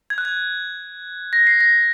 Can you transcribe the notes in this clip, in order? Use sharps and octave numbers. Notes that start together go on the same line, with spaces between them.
G#6
F#6
G#6
A#6
C7
A#6